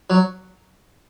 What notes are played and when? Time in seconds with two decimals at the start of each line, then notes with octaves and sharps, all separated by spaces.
0.10 F#3